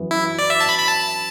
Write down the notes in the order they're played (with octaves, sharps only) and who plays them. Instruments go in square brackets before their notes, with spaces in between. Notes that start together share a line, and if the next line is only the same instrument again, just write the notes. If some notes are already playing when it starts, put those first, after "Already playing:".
Already playing: [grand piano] F#2 E3 B3 F#4
[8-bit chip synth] E4
D5
E5
A5
B5
B5
A5